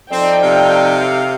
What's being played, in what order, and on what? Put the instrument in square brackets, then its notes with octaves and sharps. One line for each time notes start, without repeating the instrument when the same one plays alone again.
[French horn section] F3 A4 D5 [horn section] C4 [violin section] D#4 G5
[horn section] C3 F5